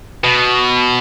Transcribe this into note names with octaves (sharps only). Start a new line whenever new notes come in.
B2